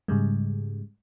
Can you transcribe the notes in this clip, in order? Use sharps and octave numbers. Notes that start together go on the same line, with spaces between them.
G#2 C#3 G3 G#3